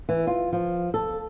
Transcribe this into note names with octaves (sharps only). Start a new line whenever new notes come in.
E3
F4
F3
A4